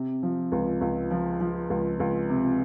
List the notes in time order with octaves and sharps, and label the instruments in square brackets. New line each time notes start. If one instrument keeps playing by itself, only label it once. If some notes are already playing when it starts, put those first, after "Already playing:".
Already playing: [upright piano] C3
F3
C#2
C#2
F3
F3
C#2
C#2
C3